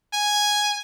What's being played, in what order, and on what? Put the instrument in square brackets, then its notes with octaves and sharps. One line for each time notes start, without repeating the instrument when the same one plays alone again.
[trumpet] G#5